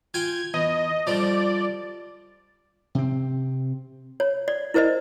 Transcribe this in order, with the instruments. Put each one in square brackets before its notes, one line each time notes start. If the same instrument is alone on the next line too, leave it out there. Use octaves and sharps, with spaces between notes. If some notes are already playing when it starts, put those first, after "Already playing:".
[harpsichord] F4 G5 G#5 [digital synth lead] G#6
[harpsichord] E2 [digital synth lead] D#5
[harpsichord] F3 G3 A3 [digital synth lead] D5
[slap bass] C3 C4
[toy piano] C#5
D5
E4 A#4 C5 D5 D#5